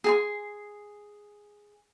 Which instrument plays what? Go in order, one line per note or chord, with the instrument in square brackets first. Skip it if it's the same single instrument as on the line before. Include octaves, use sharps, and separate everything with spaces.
[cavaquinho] G#4 G#5 C6